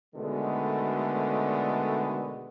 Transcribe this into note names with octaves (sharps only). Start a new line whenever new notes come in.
B2 D3 D#3 G#3 A3 B3